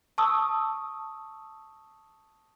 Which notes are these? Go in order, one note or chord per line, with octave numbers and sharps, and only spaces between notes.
A5 C#6 D#6 E6